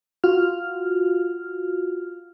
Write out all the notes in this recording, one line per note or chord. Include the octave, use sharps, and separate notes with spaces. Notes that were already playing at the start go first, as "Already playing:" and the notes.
F4 F#4 F6